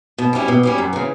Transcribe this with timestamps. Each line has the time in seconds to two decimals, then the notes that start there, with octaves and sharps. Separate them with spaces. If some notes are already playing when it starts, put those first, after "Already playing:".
0.18 B2
0.33 G3 C#4 E4
0.48 B2
0.63 G3 C#4 E4
0.78 F#2
0.93 C#3 E3